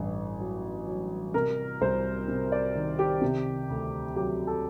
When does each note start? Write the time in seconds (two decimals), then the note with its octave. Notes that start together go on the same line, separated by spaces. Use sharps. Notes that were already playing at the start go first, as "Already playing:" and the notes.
Already playing: A1 G2
0.40 F#3
0.87 F#3
1.34 C3 A#4
1.81 C2 C5
2.28 C3
2.52 D5
2.75 D#3
2.99 G4
3.21 C3
3.70 D2
4.16 F#3 G4
4.47 A4